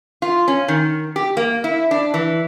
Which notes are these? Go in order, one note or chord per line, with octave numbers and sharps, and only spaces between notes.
F4
C#4
D#3
G4
A#3
E4
D4
E3